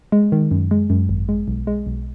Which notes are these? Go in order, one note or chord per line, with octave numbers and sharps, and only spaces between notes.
G#3
D#3
F#2
G#3
F#2
G#1
G#3
B1
G#3
B1